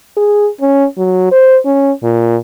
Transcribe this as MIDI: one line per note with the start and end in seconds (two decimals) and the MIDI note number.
0.17 0.49 68
0.61 0.85 61
0.98 1.29 54
1.32 1.58 72
1.66 1.92 61
2.03 2.36 46